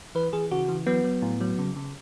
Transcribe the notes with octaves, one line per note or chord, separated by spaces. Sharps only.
E3 B4
E3 G#4
C#3 F#4
E3
F#3 B3
F#3
A2
F#3
C#3
C#3